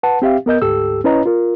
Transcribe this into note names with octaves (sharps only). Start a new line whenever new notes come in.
B4 F#5 A5
C4 G4 E5 F5
B3 A#4 D#5 G6
D2 G#2 G4 A4 E6
C#4 E4 B4 C#5 D#5 A#5
F4 A#4